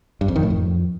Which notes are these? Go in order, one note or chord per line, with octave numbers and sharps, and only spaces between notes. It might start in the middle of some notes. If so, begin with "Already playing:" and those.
G2
F2
D#3
A2
F2